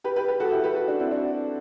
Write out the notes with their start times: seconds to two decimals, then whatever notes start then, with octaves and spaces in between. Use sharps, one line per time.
0.04 G4 B4
0.16 G4 B4
0.28 G4 B4
0.40 F#4 A4
0.52 E4 G4
0.64 G4 B4
0.76 F#4 A4
0.88 D4 F#4
1.00 C4 E4
1.11 D4 F#4